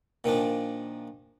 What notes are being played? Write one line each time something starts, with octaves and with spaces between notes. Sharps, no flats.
A#2 D#3 F3 D4